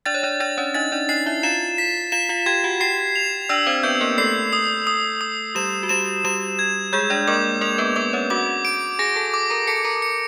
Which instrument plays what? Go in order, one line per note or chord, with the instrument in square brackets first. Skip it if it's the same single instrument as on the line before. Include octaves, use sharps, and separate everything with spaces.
[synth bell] D4 D5 [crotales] A6
[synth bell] C#5
D4 D5
[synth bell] D4 D5 [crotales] A6
[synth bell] C#4 C#5
[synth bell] D#4 D#5 [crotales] A6
[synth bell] D4 D5
[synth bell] D#4 D#5 [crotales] C7
[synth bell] E4 E5
[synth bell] F4 F5 [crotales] E7
[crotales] B6
[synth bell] F4 F5 [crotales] E7
[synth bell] F4 F5
[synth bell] G4 G5 [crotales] G#6
[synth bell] F#4 F#5
[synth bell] G4 G5 [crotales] C7
[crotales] F7
[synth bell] D4 D5 [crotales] E6
[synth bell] C4 C5
[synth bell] B3 B4 [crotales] G6
[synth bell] A#3 A#4
[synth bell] A3 A4 [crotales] C7
[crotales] D#6
D#6
D#6
[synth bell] G3 G4 [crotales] E7
[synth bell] F#4
[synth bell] G3 G4 [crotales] E7
[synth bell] G3 G4 [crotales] E7
[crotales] G#6
[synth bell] G#3 G#4 [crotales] G6
[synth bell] D4 D5
[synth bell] A#3 A#4 [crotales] D6
[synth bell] A#3 A#4 [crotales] F7
[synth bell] B3 B4
[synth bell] B3 B4 [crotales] D6
[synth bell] C#4 C#5
[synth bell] F#4 F#5 [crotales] D6
[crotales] D7
[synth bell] G#4 G#5 [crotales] A#6
[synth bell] A4 A5
[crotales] D6
[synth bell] A#4 A#5
[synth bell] A4 A5 [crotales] C#7
[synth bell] A#4 A#5
[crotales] C#7